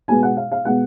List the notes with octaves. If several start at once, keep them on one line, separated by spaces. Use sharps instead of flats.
B2 G#3 B3 G#5
F#5
F5
F5
B2 G#3 B3 F#5